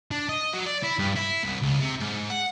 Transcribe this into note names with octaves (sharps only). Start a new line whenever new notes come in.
D4
D#5
F#3
D5
E4
G2
E4
C2
C#2
C3
G#2
F#5